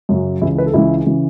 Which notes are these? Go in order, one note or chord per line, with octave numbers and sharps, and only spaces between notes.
F#2 C#3 F#3
C#2 C#3 E3 E4
B4
A4
C#2 C#3 E3 E4
C#3 E3